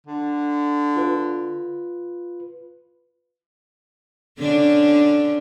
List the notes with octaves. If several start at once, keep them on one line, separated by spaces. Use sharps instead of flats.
D3
F4 B4
D3 C#4 D4